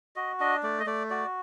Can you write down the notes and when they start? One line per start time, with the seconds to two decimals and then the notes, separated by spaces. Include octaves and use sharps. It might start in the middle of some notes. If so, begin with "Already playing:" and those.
0.16 F#4 D#5
0.40 D4 D#5
0.63 A3 D5
0.80 D#5
0.86 A3 D5
1.10 F#4 D5